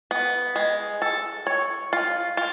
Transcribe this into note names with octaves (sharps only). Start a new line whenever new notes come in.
B3
G#3
A4
C#5
F4
F4